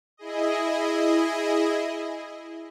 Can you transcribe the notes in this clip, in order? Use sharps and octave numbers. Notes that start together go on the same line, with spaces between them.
E4 G#4 D#5